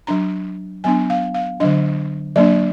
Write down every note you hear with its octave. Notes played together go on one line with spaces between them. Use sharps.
F#3 D4 A#5
F#3 B3 D4 G#5
F5
F5
D3 F#3 D4 D#5
F#3 A#3 D4 D5